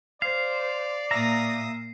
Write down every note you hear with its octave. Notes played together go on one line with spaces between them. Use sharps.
C5 D5 F5 C7
A#2 E5 F5 A#5 D#6 A#6